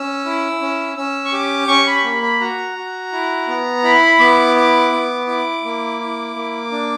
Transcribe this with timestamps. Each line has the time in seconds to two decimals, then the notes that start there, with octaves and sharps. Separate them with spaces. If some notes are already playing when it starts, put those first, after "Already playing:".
Already playing: C#4 E6
0.26 E4
0.61 C#4
0.97 C#4 E6
1.25 C#6
1.32 G4 D6
1.68 C#4 C#6
1.87 B5
1.96 C#6
2.04 A#3 B5
2.22 B5
2.40 F#4 A#5
2.76 F#4
3.12 E4
3.48 B3
3.83 E4 B5
4.19 B3 D6
4.55 E4 D6
4.92 B3
5.27 E4 D6
5.64 A#3
6.00 E4
6.35 A#3
6.72 D4